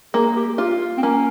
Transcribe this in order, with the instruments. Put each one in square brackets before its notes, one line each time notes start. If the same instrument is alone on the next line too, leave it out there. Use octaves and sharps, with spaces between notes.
[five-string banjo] A#3 [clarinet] G#4
[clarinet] G4
[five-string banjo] F4 [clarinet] G4
[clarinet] C4
[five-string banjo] A#3 [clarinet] C#4